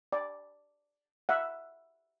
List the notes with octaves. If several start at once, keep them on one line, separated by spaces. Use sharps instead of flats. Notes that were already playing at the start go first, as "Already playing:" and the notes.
D5
E5 F#5